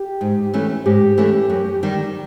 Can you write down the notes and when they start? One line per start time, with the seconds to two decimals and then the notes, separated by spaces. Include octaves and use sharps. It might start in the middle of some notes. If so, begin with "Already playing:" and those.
Already playing: G4
0.21 G#2
0.54 E3 A3 C#4
0.86 G#2 G4
1.17 E3 A3 C#4
1.50 F#2
1.83 D#3 G3